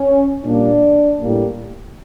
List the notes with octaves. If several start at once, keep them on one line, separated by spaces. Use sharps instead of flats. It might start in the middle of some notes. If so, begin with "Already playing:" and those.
Already playing: C#4
A#2 G3 A#3 D4
A2 G3 A#3